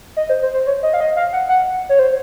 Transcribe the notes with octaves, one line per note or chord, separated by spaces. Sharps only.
D#5
C5
C5
C5
C#5
D#5
F5
D#5
F5
F#5
F#5
C#5
C5